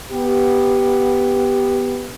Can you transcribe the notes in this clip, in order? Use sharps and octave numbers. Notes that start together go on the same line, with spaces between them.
B3 G4